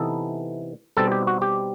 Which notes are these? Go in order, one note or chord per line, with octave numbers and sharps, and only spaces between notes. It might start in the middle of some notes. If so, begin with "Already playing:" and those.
Already playing: C3 E3 B3 D#4 A4
B2 G3 C4 D#4 A4
G4
F#4
G4